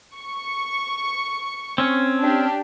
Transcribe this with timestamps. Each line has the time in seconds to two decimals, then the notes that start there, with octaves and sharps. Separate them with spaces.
0.16 C#6 C#7
1.78 C4 C#4
2.21 D4 G4